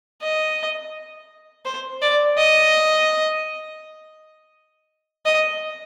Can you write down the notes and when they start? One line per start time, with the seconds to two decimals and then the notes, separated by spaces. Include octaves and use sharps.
0.22 D#5
1.65 C5
2.02 D5
2.37 D#5
5.26 D#5